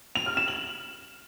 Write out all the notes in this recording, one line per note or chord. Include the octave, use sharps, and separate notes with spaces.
F7
F6
E7
F#7